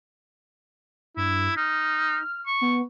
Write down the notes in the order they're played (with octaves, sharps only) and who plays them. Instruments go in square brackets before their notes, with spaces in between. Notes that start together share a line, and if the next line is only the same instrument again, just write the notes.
[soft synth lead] G2 [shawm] E4
[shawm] D#4 [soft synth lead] F6
[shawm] C#6
[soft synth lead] B3